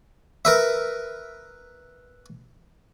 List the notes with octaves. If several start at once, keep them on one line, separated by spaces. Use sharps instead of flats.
A#4 B4 E5